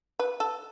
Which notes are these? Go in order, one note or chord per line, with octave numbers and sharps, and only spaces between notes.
B4
A4